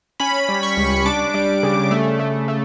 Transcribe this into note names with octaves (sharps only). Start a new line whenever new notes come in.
C#4 B5
G3
C#6
C#2
D4 D6
G3
C#3
A3
A3
A3